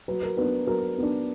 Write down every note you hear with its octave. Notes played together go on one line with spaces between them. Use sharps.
F#3 B4
A#4
B3 D4 B4
F#3 A#4
B3 D4